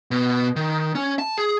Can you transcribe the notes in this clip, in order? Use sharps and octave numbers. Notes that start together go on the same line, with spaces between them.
B2
D#3
C#4
A5
G#4